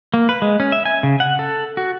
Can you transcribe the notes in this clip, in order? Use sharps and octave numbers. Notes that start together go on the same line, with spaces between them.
A#3
B4
G#3
C#4
E5
G#5
C#3
F#5
A4
F#4